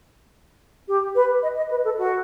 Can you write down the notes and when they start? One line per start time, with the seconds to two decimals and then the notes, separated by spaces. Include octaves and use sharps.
0.88 G4
1.15 B4
1.43 D#5
1.56 D#5
1.70 B4
1.84 A4
1.98 F#4